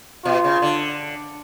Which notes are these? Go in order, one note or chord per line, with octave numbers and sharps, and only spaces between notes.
B2 F4
C#3
D3